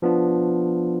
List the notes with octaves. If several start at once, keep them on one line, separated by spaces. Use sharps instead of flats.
F3 B3 D4 F4